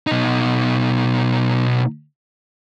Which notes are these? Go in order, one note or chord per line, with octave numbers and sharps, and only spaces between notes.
B2 D#4